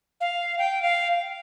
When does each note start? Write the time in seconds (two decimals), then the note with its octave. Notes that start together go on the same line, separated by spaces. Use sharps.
0.21 F5
0.58 G5
0.82 F5